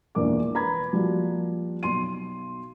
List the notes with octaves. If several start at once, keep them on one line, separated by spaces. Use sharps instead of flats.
E1 A#1 E2 E3 A#4 D6
B4 A#5 B5 G#6
F3 G3 A#3 F#4
B1 C6 D#7